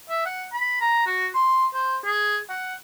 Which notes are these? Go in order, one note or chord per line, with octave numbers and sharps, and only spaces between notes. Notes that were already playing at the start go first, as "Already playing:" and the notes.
E5
F#5
B5
A#5
F#4
C6
C5
G#4
F#5